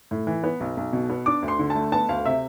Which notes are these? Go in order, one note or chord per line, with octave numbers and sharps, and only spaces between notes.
A2
E3
B3
B1
B1
B2
B3
D4 D6
D2
C6
D3
A5
A3
B3 A5
D2 F5
C3 E5